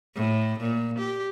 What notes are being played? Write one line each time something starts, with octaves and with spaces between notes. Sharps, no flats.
A2
A#2
G4